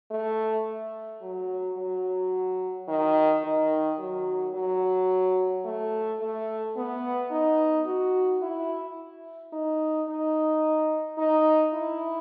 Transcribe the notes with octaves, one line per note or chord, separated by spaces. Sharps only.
A3
F#3
F#3
D#3
D#3
F#3
F#3
A3
A3
B3
D#4
F#4
E4
D#4
D#4
D#4
E4